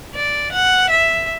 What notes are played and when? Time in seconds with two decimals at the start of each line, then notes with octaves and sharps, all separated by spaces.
0.15 D5
0.52 F#5
0.89 E5